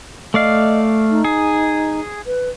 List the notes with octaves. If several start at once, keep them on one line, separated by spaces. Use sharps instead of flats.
A3 D5 D#5 F5
D#4
G#4
B4